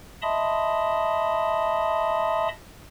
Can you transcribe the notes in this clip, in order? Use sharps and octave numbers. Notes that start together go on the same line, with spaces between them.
D#5 E5 A5 B5 C6 D#6